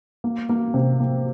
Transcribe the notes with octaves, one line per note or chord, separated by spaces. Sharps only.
A#3
A#3
C3
A#3